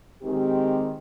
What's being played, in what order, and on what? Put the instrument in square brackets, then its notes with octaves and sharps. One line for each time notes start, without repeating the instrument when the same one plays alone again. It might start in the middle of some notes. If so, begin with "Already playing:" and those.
[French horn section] D#3 G#3 C4 G4